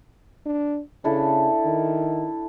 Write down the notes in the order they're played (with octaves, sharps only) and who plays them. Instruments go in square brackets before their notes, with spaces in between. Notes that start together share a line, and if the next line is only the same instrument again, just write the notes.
[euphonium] D4
[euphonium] C#3 [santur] D4 E4 A4
[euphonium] D#3